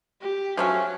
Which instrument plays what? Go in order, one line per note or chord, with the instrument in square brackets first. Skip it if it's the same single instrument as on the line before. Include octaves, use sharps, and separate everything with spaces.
[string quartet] G4
[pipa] F3 A3 C#4 [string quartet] F#3